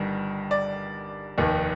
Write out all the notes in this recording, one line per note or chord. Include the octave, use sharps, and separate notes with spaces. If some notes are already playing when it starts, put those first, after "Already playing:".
Already playing: G1 G2 D#3
D5
F1 D#2 D#3